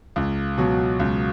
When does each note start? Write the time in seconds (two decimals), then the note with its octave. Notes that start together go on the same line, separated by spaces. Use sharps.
0.16 C#2
0.58 B2 F#3
0.99 C#2